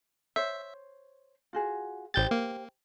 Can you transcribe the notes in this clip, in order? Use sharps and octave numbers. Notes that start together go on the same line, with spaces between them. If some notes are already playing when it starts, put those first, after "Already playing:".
C5 C#5 E5
F4 F#4 G#4
A1 G4 C5 G6 A6
A#3